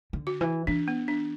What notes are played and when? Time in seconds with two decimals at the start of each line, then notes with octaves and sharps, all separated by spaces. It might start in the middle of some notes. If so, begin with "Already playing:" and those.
0.13 D3
0.27 F#4
0.41 E3
0.67 E3 D4
0.88 B3
1.08 D4